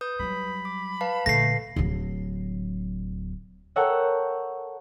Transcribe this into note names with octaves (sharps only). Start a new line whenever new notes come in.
B4 D#6 G6
F#3 G3 B5
D6
B4 F5 A5
A#1 D3 A3 A#6 C7
D1 F#3
A4 A#4 C#5 E5 F#5 G5